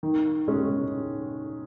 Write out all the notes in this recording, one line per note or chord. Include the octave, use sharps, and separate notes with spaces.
D#3
G#3 C#4 G#4